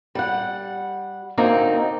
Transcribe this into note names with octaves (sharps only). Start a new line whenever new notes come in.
G3 F#5
D2 A#3 C4 D#4